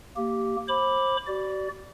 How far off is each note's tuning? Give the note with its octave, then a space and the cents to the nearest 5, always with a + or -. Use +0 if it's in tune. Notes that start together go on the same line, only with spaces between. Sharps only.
A#3 -15 G4 -10
C5 +30 B5 +0 D6 +0
F#4 +45 D5 +0